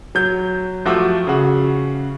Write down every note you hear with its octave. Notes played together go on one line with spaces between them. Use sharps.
F#3 G6
F3 A3 F#4 G4 D6 E6
C#3 F#4